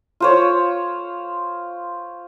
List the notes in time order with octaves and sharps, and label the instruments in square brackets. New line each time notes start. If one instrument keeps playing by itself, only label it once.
[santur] F4 C5 C#5